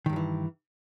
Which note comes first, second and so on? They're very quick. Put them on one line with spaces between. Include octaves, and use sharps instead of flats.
D#3 G2 F#3 E3